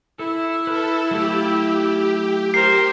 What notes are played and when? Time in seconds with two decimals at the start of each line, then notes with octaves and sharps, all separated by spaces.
0.19 E4 A4
0.67 A4 B4 B5 F6
1.11 F#3 A3 F4 G4
2.54 A#4 C5 C7